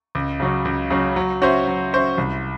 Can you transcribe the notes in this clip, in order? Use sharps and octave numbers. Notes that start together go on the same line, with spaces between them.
C#2
C#3 F#3 C#4
C#2
C#3 F#3 C#4
F#3
C#4 F#4 C5 E5
F#3
C#4 F#4 C5 E5
C2